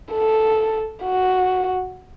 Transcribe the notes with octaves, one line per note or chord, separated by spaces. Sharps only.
A4
F#4